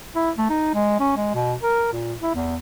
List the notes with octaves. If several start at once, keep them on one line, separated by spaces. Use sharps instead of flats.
E4
A3
D#4
G#3
C#4
G#3
B2
A#4
A#2
E4
E2